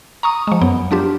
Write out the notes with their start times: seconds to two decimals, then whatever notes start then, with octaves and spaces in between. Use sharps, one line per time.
0.23 A#5 C#6 D#6
0.47 F3 G#3
0.61 F#2 F#3 B3
0.91 F#3 D4 F4 G4